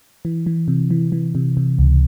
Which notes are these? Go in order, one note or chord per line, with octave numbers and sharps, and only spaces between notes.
E3
E3
C3
E3
E3
C3
C3
C#2